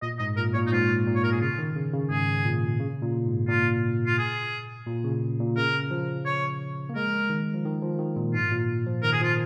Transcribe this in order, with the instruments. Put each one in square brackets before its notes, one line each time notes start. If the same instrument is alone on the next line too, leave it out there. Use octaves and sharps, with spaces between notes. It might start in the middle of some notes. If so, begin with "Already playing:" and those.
[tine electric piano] A#2 [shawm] D#5
[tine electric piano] G#2 [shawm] D#5
[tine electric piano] A#2 [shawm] A#4
[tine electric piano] A#2 [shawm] C#5
[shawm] D#4
[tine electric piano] G#2 [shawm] F4
[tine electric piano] A#2
[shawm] C#5
A#4
G#4
[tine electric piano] C#3 [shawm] F4
[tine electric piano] D#3
C#3
C#3
[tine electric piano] G#2 [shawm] G#4
[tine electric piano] A#2
C#3
A#2
G#2
[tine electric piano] A#2 [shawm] F4
[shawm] F4
G#4
[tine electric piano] A#2
C#3
A#2
[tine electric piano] C#3 [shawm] A#4
[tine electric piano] F3
[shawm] C#5
[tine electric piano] A#3
[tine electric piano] G#3 [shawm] A#4
[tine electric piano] D#3
F3
D#3
F3
D#3
A#2
[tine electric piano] G#2 [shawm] F4
[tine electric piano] A#2
F3
[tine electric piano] D#3 [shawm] A#4
[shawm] G#4
[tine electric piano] F3
[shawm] F4